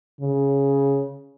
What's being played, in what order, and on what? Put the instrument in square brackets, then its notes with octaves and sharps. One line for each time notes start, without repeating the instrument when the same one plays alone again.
[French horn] C#3